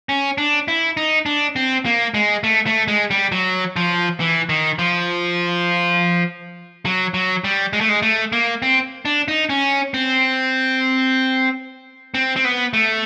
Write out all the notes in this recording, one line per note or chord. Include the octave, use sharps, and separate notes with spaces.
C#4
D4
E4
D#4
D4
C4
A#3
G#3
A3
A3
G#3
G3
F#3
F3
E3
D#3
F3
F#3
F#3
G3
G#3
A3
G#3
A3
A#3
C4
D4
D#4
C#4
C4
C4
C4
B3
A3